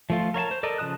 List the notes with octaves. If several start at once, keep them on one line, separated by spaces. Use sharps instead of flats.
F3 A3 F4
A#4 C#5 F5 A5
C5
A4 A#4 D5 D#5
C#3 F3 A5 D#6 F#6